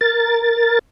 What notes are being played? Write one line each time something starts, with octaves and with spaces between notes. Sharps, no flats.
A#4 A6